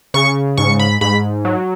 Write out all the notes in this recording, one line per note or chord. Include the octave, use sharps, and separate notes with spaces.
C#3 C#6
G#2 C#6
B5
G#2 B5
F#3